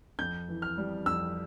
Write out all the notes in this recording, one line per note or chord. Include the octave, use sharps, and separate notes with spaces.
F2 G6
E3
F6
G3
F2 E6